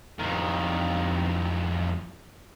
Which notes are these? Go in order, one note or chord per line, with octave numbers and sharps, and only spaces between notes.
F2 D#3